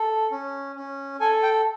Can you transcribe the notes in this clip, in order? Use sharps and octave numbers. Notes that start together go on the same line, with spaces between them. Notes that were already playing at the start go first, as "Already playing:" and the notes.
Already playing: A4
C#4
C#4
A4 G#5
G5